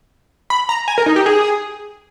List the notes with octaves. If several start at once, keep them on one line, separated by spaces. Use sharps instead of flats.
B5
A#5
G#5
A#4
D#4
G4
G#4